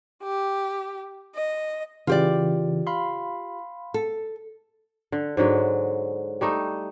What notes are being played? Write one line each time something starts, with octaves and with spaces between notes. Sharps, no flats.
G4
D#5
C#3 E3 F4 G4 D5
F5 B5 C6
A4
D3
G#2 D3 F#3 G#3
G3 A3 D#4